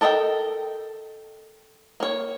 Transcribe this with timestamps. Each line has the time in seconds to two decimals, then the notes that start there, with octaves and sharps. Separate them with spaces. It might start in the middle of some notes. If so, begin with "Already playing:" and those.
0.01 A4 A#4 D#5 F#5 G5
2.00 A#3 C#5